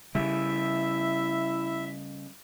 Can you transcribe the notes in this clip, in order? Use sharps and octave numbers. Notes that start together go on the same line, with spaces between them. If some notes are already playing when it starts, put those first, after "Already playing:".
C#3 G3 E4 E5